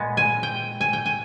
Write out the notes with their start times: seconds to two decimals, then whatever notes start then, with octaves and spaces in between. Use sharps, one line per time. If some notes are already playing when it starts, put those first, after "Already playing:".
Already playing: A#2 G#3 B3
0.17 G#5
0.43 G5
0.81 G#5
0.93 G5
1.06 G#5